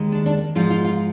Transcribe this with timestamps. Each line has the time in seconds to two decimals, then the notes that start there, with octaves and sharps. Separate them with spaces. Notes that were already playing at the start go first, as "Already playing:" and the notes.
Already playing: D#2 D#3 G#3
0.12 D4
0.26 D4
0.55 G#2 F3 G#3 F4
0.70 F4
0.85 F4